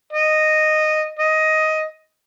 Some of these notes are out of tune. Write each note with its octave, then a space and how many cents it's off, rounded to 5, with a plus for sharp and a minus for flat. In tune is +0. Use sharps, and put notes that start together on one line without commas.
D#5 -10
D#5 +10